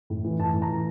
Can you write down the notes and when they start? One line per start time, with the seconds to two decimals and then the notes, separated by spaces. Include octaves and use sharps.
0.10 A2
0.24 E3
0.40 A2 A5
0.54 A2
0.62 A#5
0.69 E3